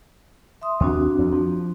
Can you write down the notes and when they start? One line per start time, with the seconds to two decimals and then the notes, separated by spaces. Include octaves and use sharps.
0.62 E5 C6 D#6
0.80 D#2 C4 D4 F#4
1.19 F2
1.32 F3